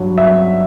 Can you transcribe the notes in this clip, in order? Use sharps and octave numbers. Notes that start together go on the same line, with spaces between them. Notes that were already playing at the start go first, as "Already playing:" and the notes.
Already playing: G2 F#3
E5